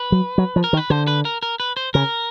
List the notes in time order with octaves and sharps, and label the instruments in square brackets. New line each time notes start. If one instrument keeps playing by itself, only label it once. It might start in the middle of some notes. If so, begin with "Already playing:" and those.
Already playing: [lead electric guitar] B4
[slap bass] F#3
F#3
F3
[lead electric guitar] A#4
[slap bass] D#3
[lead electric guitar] B4
[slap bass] D3 [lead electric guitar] C5
[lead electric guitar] B4
A#4
A#4
B4
C5
[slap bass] C#3 [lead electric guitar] A#4